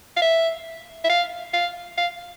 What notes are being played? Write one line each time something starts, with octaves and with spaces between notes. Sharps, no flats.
F5
E5
E5
F5
F5
F5